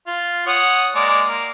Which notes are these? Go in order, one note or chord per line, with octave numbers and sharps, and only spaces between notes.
F4
C#5 F#5 D#6
G#3 A#3 D5
A#3